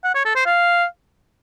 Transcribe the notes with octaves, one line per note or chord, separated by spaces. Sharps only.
F#5
C#5
A4
C5
F5